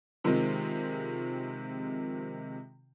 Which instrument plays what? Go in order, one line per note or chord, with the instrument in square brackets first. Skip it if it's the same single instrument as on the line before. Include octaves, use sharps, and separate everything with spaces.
[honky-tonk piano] C3 D#3 F3 G#3 C4 F4